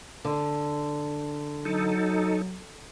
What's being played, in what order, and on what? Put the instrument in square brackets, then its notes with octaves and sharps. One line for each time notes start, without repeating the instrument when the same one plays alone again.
[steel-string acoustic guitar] D3
[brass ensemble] F#3 [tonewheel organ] D#4 A4